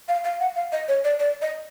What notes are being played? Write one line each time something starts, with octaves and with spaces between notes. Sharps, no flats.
F5
F5
F#5
F5
D#5
C#5
D5
D5
D#5